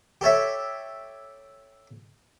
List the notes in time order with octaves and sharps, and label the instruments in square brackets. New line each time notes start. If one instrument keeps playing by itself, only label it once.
[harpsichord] G4 A4 C#5 E5